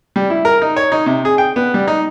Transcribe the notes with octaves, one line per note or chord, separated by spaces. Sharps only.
G3
E4
A#4
D#4
C#5
D#4
C3
G#4
G5
B3
G3
D#4